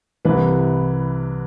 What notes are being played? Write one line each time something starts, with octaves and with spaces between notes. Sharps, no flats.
C2 C3 E3 B4